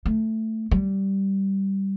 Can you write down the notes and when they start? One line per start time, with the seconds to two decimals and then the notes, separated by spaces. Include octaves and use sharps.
0.06 A3
0.71 G3